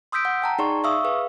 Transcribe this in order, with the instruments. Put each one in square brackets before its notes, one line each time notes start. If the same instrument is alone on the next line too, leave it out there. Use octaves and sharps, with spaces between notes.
[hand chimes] C6 D#6 E6 G6 B6 D7
F#5
G5 A5 A#5
D#4 G#4 D5 C6 C#6
E5 F5 C#6 D#6 E6
G#4 B4 F5